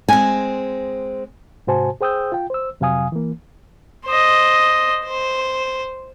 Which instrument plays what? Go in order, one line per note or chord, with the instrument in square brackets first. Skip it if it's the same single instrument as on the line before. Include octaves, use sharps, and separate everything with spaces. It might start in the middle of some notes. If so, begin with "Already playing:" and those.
[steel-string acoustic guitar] G#3 C4 [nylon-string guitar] G#5
[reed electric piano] G#2 C3 F#4 C5 G#5 A5
G#4 C5 G5 D#6 E6 G6
F4 G5
C5 E6
F2 C3 F#3 F5 G#5 D#6
E3 A#3
[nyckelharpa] C5 D#5
C5